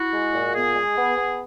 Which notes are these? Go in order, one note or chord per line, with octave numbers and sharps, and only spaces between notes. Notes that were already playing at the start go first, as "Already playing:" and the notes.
Already playing: E4 F#4
G#3
A#2
B3 G#4
G#3
B3
B3